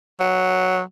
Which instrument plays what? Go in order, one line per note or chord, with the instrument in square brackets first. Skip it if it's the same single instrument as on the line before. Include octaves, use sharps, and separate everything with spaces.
[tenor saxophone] F#3